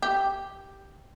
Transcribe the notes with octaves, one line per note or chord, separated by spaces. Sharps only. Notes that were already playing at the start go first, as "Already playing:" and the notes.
G4